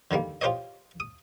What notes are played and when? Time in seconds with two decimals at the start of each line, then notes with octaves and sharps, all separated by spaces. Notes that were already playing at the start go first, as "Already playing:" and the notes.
0.11 D3 D#3 G3 A#3
0.41 F4 G4 A#4 C5 C#5 D#5
1.00 D#6